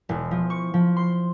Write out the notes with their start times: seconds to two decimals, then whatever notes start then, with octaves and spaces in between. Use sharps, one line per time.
0.09 E1
0.31 F3
0.50 C#6
0.74 F3
0.97 C6